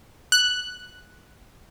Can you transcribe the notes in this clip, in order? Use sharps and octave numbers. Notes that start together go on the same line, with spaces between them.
F#6